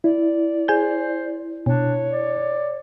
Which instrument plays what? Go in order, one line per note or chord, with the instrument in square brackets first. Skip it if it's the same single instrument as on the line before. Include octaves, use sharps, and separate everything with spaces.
[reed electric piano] E4 [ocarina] D5
[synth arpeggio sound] G#4 G#5 G6 [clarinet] C5
[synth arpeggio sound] B2 [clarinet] D4 [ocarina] C#5
[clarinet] D5